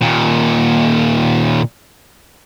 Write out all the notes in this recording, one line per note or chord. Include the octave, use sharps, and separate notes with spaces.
D#2 A#2